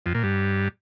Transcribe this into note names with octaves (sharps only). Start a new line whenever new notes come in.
F2
A#2
G2